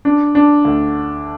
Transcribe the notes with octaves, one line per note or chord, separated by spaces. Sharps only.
D4
D4
D2